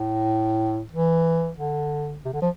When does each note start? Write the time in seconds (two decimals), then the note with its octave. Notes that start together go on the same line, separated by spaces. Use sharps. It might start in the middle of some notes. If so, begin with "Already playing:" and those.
Already playing: A2
0.92 E3
1.59 D3
2.25 C3
2.33 D3
2.42 F3